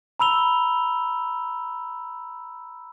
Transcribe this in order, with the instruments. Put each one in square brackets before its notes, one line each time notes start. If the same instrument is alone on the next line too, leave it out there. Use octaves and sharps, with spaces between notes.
[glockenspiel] A#5 B5 E6 F7 G7